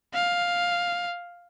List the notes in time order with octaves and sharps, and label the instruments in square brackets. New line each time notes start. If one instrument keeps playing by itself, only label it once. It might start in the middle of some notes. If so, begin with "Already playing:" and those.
[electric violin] F5